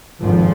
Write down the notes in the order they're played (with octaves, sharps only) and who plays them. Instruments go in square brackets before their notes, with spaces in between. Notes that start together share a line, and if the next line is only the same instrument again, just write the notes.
[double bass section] G#1 F2 G#2 F3